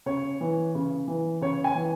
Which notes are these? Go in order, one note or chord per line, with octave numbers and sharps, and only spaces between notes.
C#3 C#5
E3
C#3
E3
C#3 C#5
G#5
E3